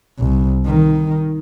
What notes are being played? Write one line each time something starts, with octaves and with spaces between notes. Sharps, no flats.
C2
D#3